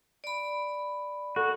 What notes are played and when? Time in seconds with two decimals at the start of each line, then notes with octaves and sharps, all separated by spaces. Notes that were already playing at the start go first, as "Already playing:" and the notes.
0.24 D5 B5
1.36 F#4 A4